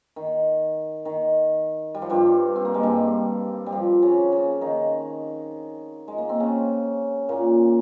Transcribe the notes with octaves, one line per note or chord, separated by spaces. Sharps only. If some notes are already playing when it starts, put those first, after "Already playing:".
D#3
D#3
G3
F3
G2 G3
C4
A#3
G#3
G2 G3
G3
F3
C#3 C#4
C#3 C#4
D#3 D#4
G#3
A#3
C4
C#3 C#4
A#2 A#3